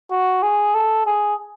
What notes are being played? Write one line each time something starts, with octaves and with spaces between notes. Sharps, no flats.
F#4
G#4
A4
G#4